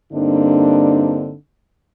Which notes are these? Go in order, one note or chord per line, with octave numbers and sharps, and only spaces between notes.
G2 D3 A#3 C4 D4 D#4